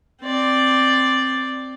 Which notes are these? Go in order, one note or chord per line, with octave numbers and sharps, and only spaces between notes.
C4 D5